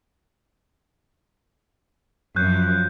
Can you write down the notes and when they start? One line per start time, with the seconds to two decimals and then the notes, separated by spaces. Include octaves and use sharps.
2.36 F#2 F3 F#6 G6